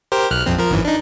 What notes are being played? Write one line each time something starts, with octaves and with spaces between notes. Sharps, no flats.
G4 A#4 C5
B1 F6 F#6
A#1 F2 C4
F3 A#4
G#1 F#2 E3
D4 D#4